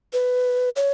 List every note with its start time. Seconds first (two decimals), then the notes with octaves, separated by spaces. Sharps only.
0.13 B4
0.76 C#5